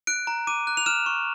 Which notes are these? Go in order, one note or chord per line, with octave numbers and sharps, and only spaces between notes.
F#6 D7
A#5
D6 D#7
F#6
F7
F6 E7
C#6